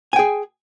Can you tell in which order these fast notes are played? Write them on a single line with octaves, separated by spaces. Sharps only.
G#5 G5 G#4